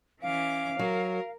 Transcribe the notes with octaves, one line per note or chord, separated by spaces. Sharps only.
E3 C#4 F5 D6
F#3 A#4